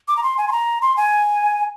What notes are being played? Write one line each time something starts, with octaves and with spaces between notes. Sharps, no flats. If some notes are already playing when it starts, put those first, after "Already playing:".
D6
A#5
C6
G#5
C6
A#5
C6
G#5